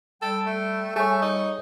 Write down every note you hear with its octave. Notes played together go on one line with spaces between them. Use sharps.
G3 A4 G5
A3
G3 A3 G#4 C#5 C#6
D#4